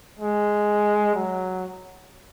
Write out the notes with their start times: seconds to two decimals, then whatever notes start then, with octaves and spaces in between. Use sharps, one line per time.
0.19 G#3
1.15 F#3